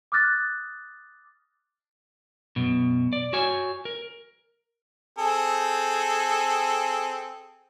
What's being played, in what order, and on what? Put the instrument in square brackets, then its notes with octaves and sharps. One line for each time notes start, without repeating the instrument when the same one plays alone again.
[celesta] D6 D#6 F6 F#6 A6 A#6
[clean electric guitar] F#2 B2
D5
F#4 C#5 G#5
A#4
[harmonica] C4 G#4 A4